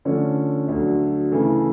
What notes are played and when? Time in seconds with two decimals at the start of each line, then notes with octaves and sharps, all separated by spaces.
0.05 D3 F3 A3 C#4
0.68 D2 D3 F#3
1.32 C#3 E3 A3